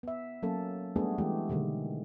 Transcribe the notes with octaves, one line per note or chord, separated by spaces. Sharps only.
B3 E5
F#3 A#3 C#4 A4
G3 A3 B3 D4 F#4 G#4
E3 G#3 A3 G4
B2 D3 D#3 G#3